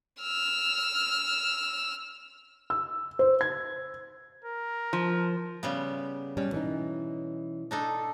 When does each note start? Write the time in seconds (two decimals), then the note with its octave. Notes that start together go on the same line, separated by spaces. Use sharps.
0.22 E6 F6
2.70 E6
3.19 C5
3.41 G#6
4.44 A#4
4.93 F3
5.63 C#3 G3 B3
6.37 B2 G3 C#4
6.52 E3 C#4 D#4
7.71 D4 D#4 A4